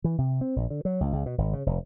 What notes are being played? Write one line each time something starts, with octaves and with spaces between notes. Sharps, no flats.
E3
C3
C4
A#1
D3
F#3
C#2
C#2
B2
G#1
C#3
F1